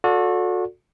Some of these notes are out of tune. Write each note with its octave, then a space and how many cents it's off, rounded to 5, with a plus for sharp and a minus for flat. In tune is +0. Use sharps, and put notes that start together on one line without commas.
F#4 -35 A4 +0 D5 -15